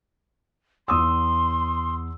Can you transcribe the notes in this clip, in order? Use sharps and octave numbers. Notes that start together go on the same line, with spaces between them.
E2 C6 D#6 E6